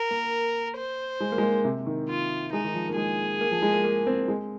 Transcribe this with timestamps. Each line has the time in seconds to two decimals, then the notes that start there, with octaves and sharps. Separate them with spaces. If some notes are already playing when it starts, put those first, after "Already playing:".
Already playing: A#4
0.11 A#3
0.77 C5
1.20 G#3
1.32 A#3
1.38 G#3
1.43 A#3
1.65 C3
1.86 D#3
2.08 F4
2.52 G#3 D#4
2.64 D#3
2.74 F3
2.89 A#3
2.96 G#3 G#4
3.41 A#3
3.51 F3
3.62 G#3
3.73 A#3
3.84 A#3
4.07 C4
4.28 G#3